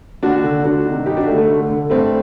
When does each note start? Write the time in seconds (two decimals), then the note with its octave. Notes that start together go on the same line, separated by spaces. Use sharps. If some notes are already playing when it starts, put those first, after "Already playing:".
0.23 D#2 D4 F#4
0.43 D3
0.64 D2 D4 F#4
0.86 C3 D#3
1.06 G2 D#4 G4
1.17 D4 F#4
1.27 D3 A3
1.38 A3
1.49 D2
1.70 D3
1.90 G2 A3 C4